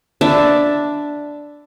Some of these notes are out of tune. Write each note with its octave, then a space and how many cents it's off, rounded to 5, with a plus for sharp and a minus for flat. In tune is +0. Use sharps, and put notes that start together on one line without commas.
D4 +0 E5 +0 B5 +30